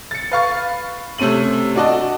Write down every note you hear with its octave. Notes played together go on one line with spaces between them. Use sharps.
A6 C#7
B4 F5 C#6 A6
C3 A3 C#4 D#7 F#7
D4 F#4 D5 D#5 A5